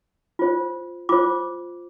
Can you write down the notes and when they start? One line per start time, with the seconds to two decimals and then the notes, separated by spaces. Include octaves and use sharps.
0.39 F4 C5
1.09 F4 C5 D6